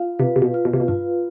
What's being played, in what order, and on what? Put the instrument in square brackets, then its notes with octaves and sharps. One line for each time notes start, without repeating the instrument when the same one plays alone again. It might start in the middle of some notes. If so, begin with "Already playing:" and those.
Already playing: [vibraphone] F4 F5
[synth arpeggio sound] C3 [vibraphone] B4
[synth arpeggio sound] C3
B2
[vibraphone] F4
[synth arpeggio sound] B2
C3
B2
[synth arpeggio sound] G2 [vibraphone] F4